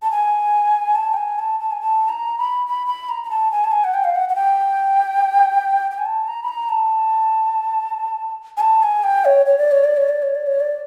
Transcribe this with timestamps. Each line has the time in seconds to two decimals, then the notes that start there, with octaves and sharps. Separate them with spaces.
0.02 A5
0.11 G#5
0.95 A5
1.14 G5
1.17 G#5
1.39 A5
1.60 A5
1.71 G#5
1.81 A5
2.09 A#5
2.38 B5
2.66 B5
2.87 B5
3.09 A#5
3.24 A#5
3.30 A5
3.51 G#5
3.64 A5
3.72 G#5
3.84 F#5
3.94 G5
4.04 F5
4.15 F#5
4.29 F#5
4.35 G5
5.91 G5
5.98 G#5
6.06 A5
6.28 A#5
6.43 B5
6.48 A#5
6.69 A5
8.57 G#5
8.60 A5
8.83 G#5
9.04 G5
9.25 C#5
9.46 C#5
9.58 D5
9.71 C#5
9.84 D5
9.97 C#5
10.09 D5
10.22 C#5
10.35 D5
10.47 C#5
10.60 D5